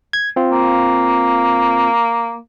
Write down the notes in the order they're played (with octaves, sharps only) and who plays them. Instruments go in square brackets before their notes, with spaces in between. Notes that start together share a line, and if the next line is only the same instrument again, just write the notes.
[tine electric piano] G#6
C4 F4
[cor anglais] A#3